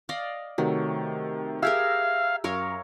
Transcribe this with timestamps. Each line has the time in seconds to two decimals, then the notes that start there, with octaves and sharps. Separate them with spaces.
0.09 D5 D#5 F5
0.58 C3 D#3 F#3 A3
1.63 G4 G#4 A#4 E5 F5 E6 G#6
2.44 F#2 A#4 C#5 F5